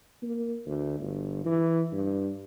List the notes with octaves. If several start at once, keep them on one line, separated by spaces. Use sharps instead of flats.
A#3
D2
G1
E3
G2